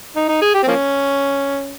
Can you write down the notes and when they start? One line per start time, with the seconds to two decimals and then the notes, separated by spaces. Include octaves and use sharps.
0.16 D#4
0.29 D#4
0.42 G#4
0.54 G4
0.63 C4
0.68 F3 A#3 C#4